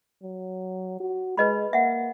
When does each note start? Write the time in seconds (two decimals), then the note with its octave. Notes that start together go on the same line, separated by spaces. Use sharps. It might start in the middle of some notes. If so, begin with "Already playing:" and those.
0.22 F#3
1.00 F#4
1.37 G#3 B4 D#5 B5
1.73 A#3 E5 F#5